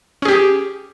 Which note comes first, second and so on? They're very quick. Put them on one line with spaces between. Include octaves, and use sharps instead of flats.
C#4 G#4 G4